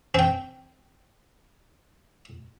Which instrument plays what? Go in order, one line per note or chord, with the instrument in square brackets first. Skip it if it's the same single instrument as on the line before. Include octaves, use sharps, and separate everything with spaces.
[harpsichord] C4 G5